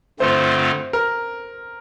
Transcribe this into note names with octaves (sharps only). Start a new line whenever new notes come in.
G2 D3 A3 C4 F4 C5
A#4